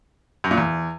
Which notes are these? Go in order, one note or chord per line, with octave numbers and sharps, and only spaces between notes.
F#2
A#2
E2